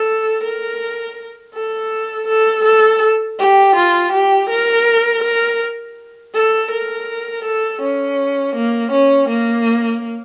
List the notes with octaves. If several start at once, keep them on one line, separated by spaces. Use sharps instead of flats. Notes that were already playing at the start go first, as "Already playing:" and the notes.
Already playing: A4
A#4
A4
A4
A4
G4
F4
G4
A#4
A#4
A4
A#4
A4
C#4
A#3
C#4
A#3